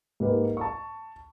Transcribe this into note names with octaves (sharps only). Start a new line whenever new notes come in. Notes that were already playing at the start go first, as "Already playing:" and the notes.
G#2 A#3 G4 B4
A5 C#6